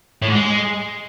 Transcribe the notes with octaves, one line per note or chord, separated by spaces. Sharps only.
A2
G#2
G#3